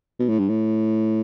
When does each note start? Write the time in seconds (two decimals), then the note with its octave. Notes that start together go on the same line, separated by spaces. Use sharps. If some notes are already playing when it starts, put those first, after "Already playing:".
0.19 B2
0.29 A2
0.39 G2
0.49 A2